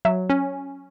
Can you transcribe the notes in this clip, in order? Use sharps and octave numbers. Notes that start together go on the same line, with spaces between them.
F#3 E5
C#4